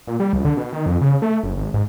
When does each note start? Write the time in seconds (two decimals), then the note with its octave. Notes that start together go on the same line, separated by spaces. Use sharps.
0.07 A#2
0.20 G3
0.33 C#2
0.45 D3
0.57 B2
0.73 D#3
0.86 F2
1.01 C#3
1.22 A3
1.43 F#1
1.57 G#1
1.74 G#2